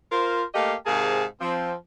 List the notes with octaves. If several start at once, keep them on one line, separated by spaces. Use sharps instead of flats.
F4 A#4 C5
A3 A#3 G4 D#5 F5
G#2 C3 G#4 A#4 F5 A5
F3 C4